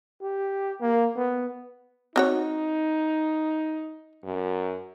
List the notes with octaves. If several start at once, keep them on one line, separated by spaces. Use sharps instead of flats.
G4
A#3
B3
C4 D#4 F#4 C#5
F#2